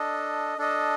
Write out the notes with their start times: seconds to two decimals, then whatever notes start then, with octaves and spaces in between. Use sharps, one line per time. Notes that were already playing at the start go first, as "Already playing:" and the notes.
Already playing: D4 A4 D#5
0.58 D4 A4 D#5